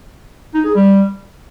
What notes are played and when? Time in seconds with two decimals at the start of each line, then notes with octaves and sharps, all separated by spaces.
0.54 D#4
0.65 G#4
0.75 G3